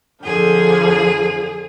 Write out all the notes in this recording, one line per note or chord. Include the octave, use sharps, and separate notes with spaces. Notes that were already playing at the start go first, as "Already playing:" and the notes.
F2 D3 F3 G#4